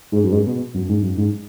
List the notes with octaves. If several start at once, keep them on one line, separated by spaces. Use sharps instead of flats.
G#2
F#2
G#2
B2
F#2
G#2
F#2
G#2